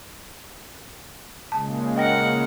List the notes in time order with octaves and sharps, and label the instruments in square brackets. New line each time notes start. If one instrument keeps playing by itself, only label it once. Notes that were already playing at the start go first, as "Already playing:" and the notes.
[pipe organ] A#2 C#3 G#3 [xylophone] A5
[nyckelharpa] A#4 F#5 [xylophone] D#5 G5 A#6